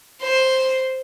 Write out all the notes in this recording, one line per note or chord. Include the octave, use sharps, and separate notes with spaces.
C5